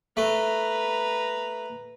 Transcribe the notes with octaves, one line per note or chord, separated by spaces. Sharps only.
A3 B4 A#5